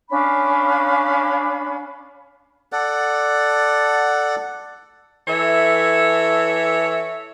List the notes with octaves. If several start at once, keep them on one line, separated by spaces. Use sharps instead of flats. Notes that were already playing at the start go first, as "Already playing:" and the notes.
C#4 D4 F5 B5
A4 D5 F#5
E3 A4 C#5 E5